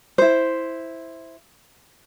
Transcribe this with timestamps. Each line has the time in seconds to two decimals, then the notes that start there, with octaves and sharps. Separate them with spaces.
0.18 E4 C5